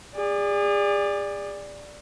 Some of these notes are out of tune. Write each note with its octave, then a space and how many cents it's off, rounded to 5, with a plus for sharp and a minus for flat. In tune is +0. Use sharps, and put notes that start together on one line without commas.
G#4 -35 D5 +0